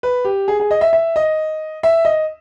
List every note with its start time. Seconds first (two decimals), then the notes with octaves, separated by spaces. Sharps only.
0.03 B4
0.25 G4
0.48 G#4
0.60 G#4
0.71 D#5
0.81 E5
0.93 E5
1.16 D#5
1.83 E5
2.05 D#5